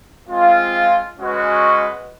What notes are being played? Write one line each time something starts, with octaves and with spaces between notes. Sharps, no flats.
G#3 C4 F4
G#3 C#4 F#4 B4 D#5